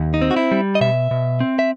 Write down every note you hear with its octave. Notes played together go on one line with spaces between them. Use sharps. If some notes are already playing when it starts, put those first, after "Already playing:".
Already playing: D#2
D#4
C4
F#4
E4
G3
D#5
B2 E5
B2
C4
E5